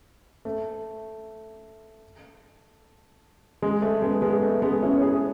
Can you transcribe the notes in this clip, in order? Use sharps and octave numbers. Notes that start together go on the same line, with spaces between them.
A3
G#3
A3
G#3 B3
G#3 B3
A3
G#3 B3
C#4 E4
C#5
G#4 B4